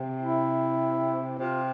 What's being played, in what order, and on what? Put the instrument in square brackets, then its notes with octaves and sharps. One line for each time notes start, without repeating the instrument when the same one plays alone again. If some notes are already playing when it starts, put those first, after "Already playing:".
Already playing: [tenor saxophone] C3
[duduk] E4
[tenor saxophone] C3 [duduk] F4